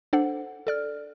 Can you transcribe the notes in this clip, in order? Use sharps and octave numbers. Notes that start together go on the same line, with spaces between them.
D4 A4 C5 F#5
A4 D5 F6